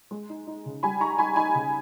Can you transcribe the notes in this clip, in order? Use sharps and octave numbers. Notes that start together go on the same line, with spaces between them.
G#3
D#4
D#4
C#3
G3 G#5 B5
D#4 A#5 C#6
D#4 G#5 B5
D#4 G#5 B5
C#3